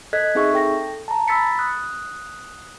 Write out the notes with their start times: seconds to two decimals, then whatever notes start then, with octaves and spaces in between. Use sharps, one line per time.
0.13 A4 D#5 F#6 G#6 B6
0.35 C4 D#4 G#4 E5 C#6
0.54 A4 G5 A#6
1.08 A5 A#5
1.28 B5 E6 A6 B6 C#7
1.59 D#6 F#6